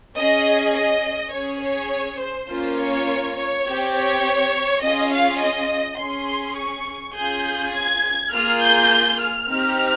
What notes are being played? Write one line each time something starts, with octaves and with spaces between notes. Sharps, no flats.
C#4 G#4 D#5
D#5
C#4 G#4 C#5
C#5
C5
A#3 C#4 F4
C#5
C#5
C4 G4
C#5
C#4 F4 G#4 D#5
F5
D#5
C#4 G#4 C6
C#6
C#4 F4 G#4 G6
G#6
A#3 F4 G#4 F6
G6
F6
C4 D#4 G4